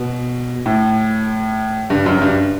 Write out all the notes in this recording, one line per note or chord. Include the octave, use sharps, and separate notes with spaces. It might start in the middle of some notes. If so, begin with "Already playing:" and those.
Already playing: B2
A2
G2
F#2
G2